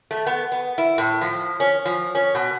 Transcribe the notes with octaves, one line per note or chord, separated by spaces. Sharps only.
A3
B3
B3
E4
A2
F3
C#4
F3
C#4
B2